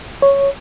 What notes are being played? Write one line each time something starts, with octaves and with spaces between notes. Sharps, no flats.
C#5